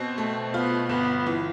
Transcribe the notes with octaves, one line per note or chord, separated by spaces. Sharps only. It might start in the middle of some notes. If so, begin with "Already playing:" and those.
Already playing: B2 C4
A3
B3 F4
G1 B3
E3